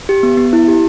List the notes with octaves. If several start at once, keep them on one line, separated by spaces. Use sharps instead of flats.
G4
B3
B3
E4
G4